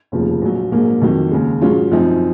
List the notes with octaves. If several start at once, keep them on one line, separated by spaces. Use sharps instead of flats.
F1 D#2 C#3 F3
A#1 A#2 F#3
A#1 G#2 F#3 A#3
F2 D#3 F#3
D#2 C#3 G#3
G#2 F#3 C#4 F4
F#2 F3 C4 D#4